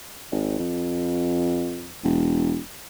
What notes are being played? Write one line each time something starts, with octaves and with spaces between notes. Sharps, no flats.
G#1
F2
E1